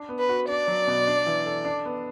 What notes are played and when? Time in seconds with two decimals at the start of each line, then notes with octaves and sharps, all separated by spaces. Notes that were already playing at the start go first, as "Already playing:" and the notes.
Already playing: D4
0.09 B3
0.19 B4
0.29 F#4
0.49 D4 D5
0.68 F#3
0.87 B2
1.07 D4
1.26 E3
1.46 A4
1.65 D4
1.85 B3